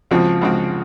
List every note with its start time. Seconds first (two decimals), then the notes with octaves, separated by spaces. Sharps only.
0.11 C#2 C#3 F3 G#3 C4 F#4
0.41 C#2 C#3 G#3 C4 F#4